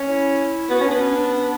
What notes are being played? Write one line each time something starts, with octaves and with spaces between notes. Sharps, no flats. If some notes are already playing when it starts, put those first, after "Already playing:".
Already playing: C#4
E4
B3 F#4
C#4
B3 D4
C#4
D4
D4